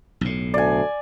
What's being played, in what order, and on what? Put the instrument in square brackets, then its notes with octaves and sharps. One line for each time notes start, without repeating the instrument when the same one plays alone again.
[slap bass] B1 A2
[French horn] D2 [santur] D5 G#5